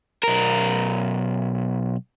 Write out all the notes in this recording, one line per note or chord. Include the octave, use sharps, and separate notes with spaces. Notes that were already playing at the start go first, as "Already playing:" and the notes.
B1 A#4